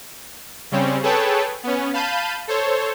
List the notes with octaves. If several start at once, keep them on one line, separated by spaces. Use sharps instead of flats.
C#3 G3 C4 C#4
G#4 A4 B4 C#5 G5 A5
B3 C#4
F5 A5 B5 G6 D#7
A4 C5 C#5